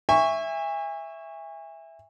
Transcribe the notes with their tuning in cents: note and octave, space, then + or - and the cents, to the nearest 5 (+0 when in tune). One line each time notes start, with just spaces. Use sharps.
E5 +0 G#5 -35 C#6 +0